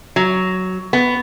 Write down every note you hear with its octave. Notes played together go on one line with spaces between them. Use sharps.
F#3
B3